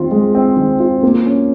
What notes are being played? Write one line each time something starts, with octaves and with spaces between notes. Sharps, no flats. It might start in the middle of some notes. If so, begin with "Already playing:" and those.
Already playing: D#3 C4 F4
G#3
C4
D#3
F4
A#3
C#4